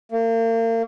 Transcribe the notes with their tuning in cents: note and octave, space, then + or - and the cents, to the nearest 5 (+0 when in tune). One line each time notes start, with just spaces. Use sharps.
A#3 -35